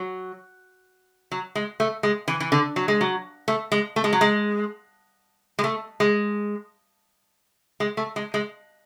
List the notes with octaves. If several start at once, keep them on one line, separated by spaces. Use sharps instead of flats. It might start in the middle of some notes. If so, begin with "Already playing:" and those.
Already playing: F#3
F#3
G#3
A3
G#3
E3
E3
D3
F#3
G#3
F#3
A3
G#3
A3
G#3
F#3
G#3
G#3
A3
G#3
G#3
A3
G#3
G#3